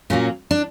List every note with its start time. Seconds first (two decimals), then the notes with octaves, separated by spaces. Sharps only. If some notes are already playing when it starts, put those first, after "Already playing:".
0.10 A#2 F#3 A#3 C#4
0.51 D4